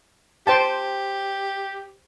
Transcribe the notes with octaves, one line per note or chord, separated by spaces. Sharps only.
G4 C5 G5 A5